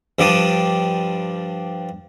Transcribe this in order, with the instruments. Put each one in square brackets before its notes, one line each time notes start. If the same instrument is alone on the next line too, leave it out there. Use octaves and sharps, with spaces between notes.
[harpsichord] G2 F3 G3 D4 G4 D#6